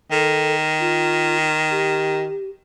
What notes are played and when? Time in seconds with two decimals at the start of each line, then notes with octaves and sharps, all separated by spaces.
0.11 D#3 A4
0.80 F4
1.71 G4